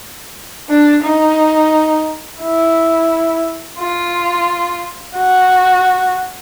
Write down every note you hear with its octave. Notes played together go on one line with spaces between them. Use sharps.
D4
D#4
E4
F4
F#4